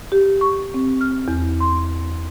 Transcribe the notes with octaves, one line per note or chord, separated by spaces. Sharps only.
G4
C#6
C4
F6
E2
C6